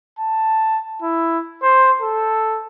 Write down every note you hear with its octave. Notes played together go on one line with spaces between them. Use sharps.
A5
E4
C5
A4